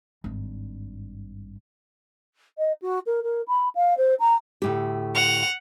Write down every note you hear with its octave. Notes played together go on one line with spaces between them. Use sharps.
G#1 G2
D#5
F#4
A#4
A#4
B5
F5
C5
A#5
D2 A2 G4
F#5 F7